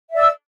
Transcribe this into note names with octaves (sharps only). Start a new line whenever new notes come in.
D5 E5 E6